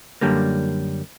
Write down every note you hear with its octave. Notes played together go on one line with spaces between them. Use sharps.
F#2 D3 G3 A#3